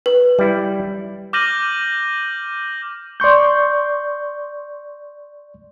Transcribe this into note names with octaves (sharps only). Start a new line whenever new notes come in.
B4
G3 E4
D6 F6 G6 A#6 D#7 F#7
D5 C6 C#6 G6